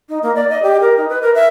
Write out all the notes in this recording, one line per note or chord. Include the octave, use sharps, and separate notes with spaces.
D#4
A#3
D5
D#5
G4
A#4
D#4
B4
A#4
E5